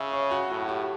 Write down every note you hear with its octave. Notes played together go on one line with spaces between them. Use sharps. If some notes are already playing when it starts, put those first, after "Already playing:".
Already playing: C#3 E5
C#5
F#4
A2 F#4
G4